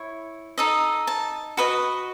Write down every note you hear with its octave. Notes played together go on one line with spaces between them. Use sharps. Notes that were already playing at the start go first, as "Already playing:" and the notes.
Already playing: E4 C#5
D#4 A4 D#5
A5
F#4 B4 D#5